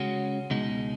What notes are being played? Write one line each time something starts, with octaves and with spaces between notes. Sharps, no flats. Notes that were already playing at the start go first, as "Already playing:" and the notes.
Already playing: C#3 G#3 C#4 F#4
C#2 B2 G#3 D#4